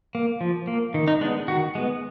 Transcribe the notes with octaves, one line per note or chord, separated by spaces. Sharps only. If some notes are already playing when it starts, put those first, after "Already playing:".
A#3
F3
A#3
D#3
D#4
G#3 B3 D4
D#3 F#4
G#3 B3